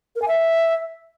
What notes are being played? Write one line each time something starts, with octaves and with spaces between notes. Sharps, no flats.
A#4
G#5
E5